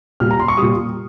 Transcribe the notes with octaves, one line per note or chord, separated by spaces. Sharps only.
A#2 G3 F6
A#5
C6
C#6
A#2 G3 D#6